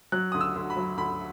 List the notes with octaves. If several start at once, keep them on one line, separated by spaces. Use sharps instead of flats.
F#3 F#6
D2 D#6
E6
D2
B5
F#3
D2 B5